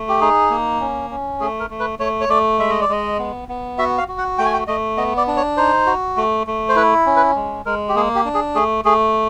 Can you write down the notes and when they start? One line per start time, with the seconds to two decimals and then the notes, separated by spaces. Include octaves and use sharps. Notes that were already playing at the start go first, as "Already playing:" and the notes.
Already playing: A3
0.09 G4
0.21 D#4 G#4
0.50 A#3
0.80 C#4
1.10 C#4
1.40 A3 G#4
1.60 A#4
1.70 A3
1.80 B4
1.99 A3 C#5
2.21 C#5
2.29 A3 D5
2.59 G#3 E5
2.70 D#5
2.81 D5
2.89 G#3 D#5
3.19 B3
3.49 B3
3.78 F#4 E5
3.98 F5
4.08 F#4
4.18 F#5
4.38 A3 G5
4.45 G#5
4.53 G5
4.67 A3 D#5
4.97 B3 D#5
5.17 D5
5.27 D4
5.37 C#5
5.57 D#4 C5
5.86 F#4
6.17 A3
6.47 A3
6.69 C5
6.76 E4 B4
7.06 C#4
7.16 B4
7.35 G#3
7.65 G#3 A#4
7.89 G4
7.95 A#3 G#4
8.15 G4
8.25 D4
8.35 G#4
8.55 A3 G#4
8.85 A3 G#4